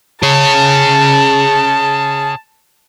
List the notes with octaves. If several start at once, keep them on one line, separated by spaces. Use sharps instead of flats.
G#4 C#5 A5